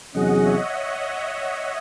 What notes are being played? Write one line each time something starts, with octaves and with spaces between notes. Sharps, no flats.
E2 C3 F#3 C#4 G#4 D#5 F#5
C#5 E5